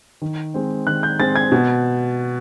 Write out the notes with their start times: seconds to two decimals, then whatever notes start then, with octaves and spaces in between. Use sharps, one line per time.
0.22 D#3
0.54 G#3 C4
0.87 D#3 F#6
1.03 G6
1.19 G#3 C4 A6
1.36 G#6
1.52 B2